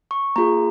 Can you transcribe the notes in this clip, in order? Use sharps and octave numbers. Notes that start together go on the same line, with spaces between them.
C#6
A#3 F4 G#4 A#5